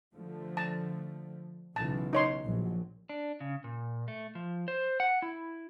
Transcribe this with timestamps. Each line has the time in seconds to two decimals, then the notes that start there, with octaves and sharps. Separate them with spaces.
0.14 D3 F3 A3
0.57 A5
1.76 B1 C#3 E3 A5
2.13 D#4 C#5 C6
2.43 A#1 F#3
3.09 D4
3.40 C#3
3.64 A#2
4.08 A3
4.35 F3
4.68 C5
5.00 F#5
5.22 E4